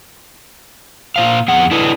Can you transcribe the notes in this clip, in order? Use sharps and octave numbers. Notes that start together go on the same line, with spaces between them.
A#2 C5 F5
F2 B3 G#4 F#5
D4 E4 A4 B4 D#5